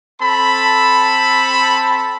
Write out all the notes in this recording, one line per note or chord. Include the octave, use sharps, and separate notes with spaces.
C4 A4 A5 B5